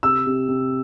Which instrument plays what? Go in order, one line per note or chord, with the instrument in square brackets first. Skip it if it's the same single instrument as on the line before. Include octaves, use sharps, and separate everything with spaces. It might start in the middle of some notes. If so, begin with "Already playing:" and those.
[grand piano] C3 E6
C3
C3